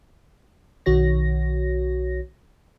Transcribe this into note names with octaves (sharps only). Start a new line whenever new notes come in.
B1 D#3 F#4 C#5 A#6